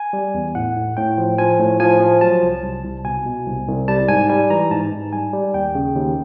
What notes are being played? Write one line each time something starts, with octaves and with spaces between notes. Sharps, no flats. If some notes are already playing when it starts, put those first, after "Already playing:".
Already playing: G#5
G3
E2
A2 F#5
A2
A2 G5
F3
F3 G#5
A2
F3 G#5
F3
F#3 A5
C2
C2
C2
B2 G#5
B2
C2
C2
G3 A5
G#2 G#5
G3 G#5
E3 A#5
G#2 A5
G#2
G3 G#5
G3
D#2 G5
C#3
D#2